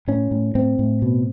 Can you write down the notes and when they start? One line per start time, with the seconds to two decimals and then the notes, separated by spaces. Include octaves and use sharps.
0.08 A2 C#4
0.31 A2
0.55 A2 C4
0.79 A2
1.02 B2